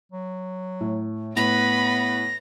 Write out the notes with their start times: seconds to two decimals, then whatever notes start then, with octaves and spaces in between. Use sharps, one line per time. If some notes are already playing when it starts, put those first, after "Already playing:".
0.12 F#3
0.81 A2
1.37 A2 B3 B4 B5 A#6